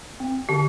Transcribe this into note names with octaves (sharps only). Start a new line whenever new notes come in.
C4
D3 G4